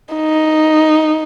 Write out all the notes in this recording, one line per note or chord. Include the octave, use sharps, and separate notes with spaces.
D#4